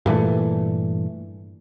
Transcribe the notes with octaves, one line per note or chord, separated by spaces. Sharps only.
G2 A#2 E3 A3